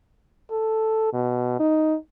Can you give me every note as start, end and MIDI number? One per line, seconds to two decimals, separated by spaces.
0.51 1.09 69
1.13 1.58 47
1.60 1.95 63